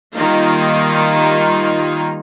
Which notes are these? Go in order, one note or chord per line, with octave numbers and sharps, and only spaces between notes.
D#3 G3 A#3 D#4 F4